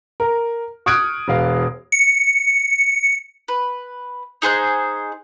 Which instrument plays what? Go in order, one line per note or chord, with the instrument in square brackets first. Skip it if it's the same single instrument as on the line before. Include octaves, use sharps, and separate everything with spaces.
[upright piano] A#4
C#6 D#6 F6 F#6 G#6 D7
E1 F5
[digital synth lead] C#7
[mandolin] B4
D#4 G#4 C5 F#6